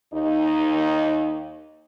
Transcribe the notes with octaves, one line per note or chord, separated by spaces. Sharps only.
D#2 D#4